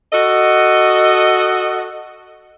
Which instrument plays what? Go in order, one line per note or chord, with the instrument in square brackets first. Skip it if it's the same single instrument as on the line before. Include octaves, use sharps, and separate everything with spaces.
[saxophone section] F#4 A4 D#5